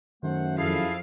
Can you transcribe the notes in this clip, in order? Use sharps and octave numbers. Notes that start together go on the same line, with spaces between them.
F#2 D#3 A3 C5 F#5
F2 E4 G#4 A4 F5